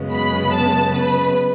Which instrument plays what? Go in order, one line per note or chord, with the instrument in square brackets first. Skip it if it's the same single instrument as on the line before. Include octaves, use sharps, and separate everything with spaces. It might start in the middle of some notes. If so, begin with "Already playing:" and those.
Already playing: [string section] F#2 C#3 G#3 B3
B5
A5
B4